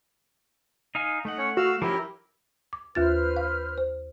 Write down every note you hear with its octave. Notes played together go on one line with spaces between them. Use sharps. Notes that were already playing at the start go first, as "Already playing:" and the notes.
D#4 F5 G#5
A3 D#4 F#5
C#4 C#5
F#4 F5 E6
F3 F#3 C#4 E4 G4 A#4
D6
D#2 F4 B4 C5 F6 A6
F5
C5